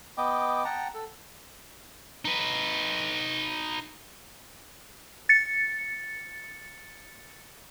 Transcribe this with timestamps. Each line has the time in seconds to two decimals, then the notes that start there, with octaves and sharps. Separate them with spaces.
0.18 B3 D#5 G5 D6
0.65 F#5 G5 A5 A#5
0.94 A4
2.25 D#4 B4
5.29 A6 C#7